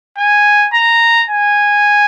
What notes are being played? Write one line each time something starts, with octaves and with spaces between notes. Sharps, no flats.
G#5
A#5
G#5